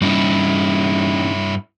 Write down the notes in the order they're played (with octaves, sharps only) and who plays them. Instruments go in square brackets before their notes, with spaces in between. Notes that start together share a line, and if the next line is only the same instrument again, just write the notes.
[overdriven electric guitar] G2 E4 [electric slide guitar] G3 C#4 D#4